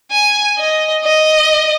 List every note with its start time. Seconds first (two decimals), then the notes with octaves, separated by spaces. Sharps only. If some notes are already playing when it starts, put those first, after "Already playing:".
0.12 G#5
0.58 D#5
1.04 D#5